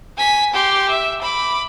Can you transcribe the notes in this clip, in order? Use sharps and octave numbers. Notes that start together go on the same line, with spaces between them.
G#5 B6
G4 C6
E5
B5 D6